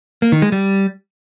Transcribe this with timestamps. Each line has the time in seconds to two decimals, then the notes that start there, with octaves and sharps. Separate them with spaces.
0.22 A#3
0.32 D#3
0.42 G#3
0.52 G3